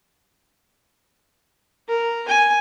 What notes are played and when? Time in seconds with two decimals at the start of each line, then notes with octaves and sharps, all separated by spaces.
1.88 A#4
2.29 G#5